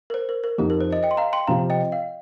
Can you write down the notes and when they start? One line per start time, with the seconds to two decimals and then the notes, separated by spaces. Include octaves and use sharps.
0.10 A#4
0.14 C5
0.29 A#4
0.44 A#4
0.58 F2 F3 D#4 G4
0.70 A#4
0.81 C5
0.93 D#5
1.03 D#5 G5
1.11 C6
1.17 F5 A#5
1.33 G5 C6
1.47 C3 F3 C4 F4 F5 A#5
1.70 D#5 G5
1.92 F5